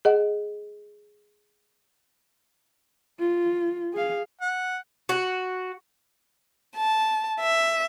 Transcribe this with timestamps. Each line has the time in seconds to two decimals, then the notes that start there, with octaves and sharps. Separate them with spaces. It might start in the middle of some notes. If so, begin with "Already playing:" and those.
0.05 G#4 D#5 F#5
3.19 F4
3.93 G#4 F5
4.41 F#5
5.09 F#4
6.76 A5
7.40 E5